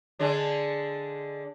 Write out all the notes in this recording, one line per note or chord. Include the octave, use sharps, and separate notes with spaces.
D3 G#3 D4